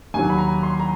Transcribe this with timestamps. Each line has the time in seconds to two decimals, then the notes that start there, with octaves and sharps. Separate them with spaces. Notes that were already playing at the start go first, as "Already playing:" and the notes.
0.14 D#2 D#3 F#3 G#5
0.30 B5
0.38 A#5
0.63 C6
0.80 A#5